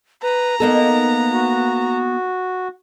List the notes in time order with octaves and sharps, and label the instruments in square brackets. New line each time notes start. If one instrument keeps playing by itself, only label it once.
[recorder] B4 [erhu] A#5
[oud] A#3 D#4 A4 [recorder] B3
[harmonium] F#4